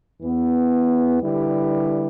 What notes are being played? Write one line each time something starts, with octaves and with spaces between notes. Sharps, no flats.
E2 E3 B3
D3 G3 E4 G4 B4